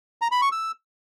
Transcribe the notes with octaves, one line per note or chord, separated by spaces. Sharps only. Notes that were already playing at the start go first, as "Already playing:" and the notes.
A#5
B5
C#6
E6